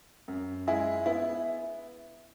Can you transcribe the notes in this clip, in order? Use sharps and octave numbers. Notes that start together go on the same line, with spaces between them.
F#2
G#3 E4 G#4
B3 E4